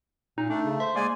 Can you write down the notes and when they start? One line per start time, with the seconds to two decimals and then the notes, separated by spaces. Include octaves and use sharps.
0.38 A#2 D#4
0.50 A3 D4
0.66 C#3
0.80 C5 E5
0.96 G#3 A#3 D5 G#5